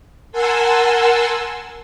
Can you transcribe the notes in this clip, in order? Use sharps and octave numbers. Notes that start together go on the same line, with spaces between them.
A#4 F#5 G#5 A5 C6 E6